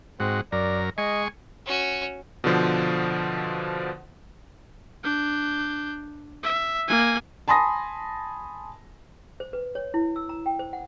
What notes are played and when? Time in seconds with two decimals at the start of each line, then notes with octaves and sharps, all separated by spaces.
0.20 G#2 C4 F#4
0.52 F#2 A#4 D5
0.98 G#3 D#5 G#5 C#6
1.66 C#4 F#4
2.44 B2 D3 F3 C5
5.04 D4 G6
6.43 E5
6.88 A#3 G#5
7.48 G#5 A5 B5 C6 D#6 A#6
9.40 C5
9.53 B4
9.75 C#5
9.94 E4
10.16 E6
10.29 A#5
10.46 G5
10.59 C5
10.73 F#5